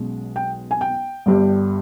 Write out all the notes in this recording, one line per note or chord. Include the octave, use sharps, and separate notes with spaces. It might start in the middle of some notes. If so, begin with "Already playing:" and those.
Already playing: B1 B2 G#3 C#4
G5
G#5
G5
G1 G2 G3